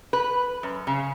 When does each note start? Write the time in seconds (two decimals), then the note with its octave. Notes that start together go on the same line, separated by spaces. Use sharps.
0.13 B4
0.63 F#2
0.87 C#3